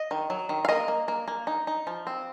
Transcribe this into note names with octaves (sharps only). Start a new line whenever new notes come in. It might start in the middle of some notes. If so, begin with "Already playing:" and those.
Already playing: D#5
D#3
F#3
D#3
F5
A#3 D#5
A#3
A#3
A#3
D#4
D#4
F3
C4